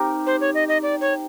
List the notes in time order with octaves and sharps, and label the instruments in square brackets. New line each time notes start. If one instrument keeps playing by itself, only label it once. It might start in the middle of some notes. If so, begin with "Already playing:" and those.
Already playing: [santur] C4 D#4 G4 A#4
[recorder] C5
C#5
D#5
D#5
D5
C#5